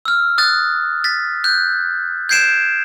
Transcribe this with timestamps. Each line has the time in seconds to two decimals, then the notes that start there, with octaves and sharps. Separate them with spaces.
0.05 E6 F6
0.38 D#6 F#6 A6
1.04 A6 B6
1.44 F#6 G6
2.29 G6 G#6 C7 D7 E7